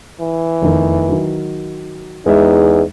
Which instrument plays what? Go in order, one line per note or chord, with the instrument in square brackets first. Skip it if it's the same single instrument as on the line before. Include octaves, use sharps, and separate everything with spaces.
[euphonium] E3
[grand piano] F1 E2 D#3
D#3 F#3
[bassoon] E2 [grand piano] G#3 E5 [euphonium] D#4